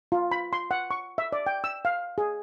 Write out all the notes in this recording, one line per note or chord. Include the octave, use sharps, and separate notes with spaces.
F4
B5
C6
F#5
C#6
E5
D5
G5
E6
F5
G#4